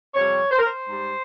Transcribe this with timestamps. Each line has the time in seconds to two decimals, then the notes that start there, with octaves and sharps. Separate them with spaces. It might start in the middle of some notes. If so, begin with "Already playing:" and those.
0.14 F2 C3 G3 C#5
0.50 C5
0.59 A#4
0.67 C5
0.86 G#2 G3